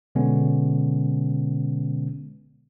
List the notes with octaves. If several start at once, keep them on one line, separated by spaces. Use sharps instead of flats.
B2 D3 G#3 B3 C#4